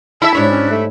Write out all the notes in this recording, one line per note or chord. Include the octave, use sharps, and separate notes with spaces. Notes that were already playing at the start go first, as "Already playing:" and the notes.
E4 E5 A5
G#2 G3 D4 C#5
C#4
A3